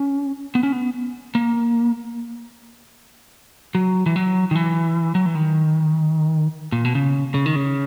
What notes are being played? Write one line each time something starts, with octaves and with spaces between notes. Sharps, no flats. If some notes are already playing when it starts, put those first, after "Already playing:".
Already playing: C#4
B3
C#4
B3
A#3
F#3
E3
F#3
D#3
E3
F#3
E3
D#3
A#2
B2
C#3
C#3
D#3
C#3